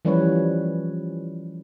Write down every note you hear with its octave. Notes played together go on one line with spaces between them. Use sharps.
E3 F3 G3 C#4 B4 C#5